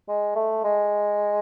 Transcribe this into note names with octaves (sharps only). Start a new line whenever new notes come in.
G#3
A3
G#3